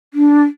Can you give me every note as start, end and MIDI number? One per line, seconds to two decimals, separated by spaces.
0.13 0.42 62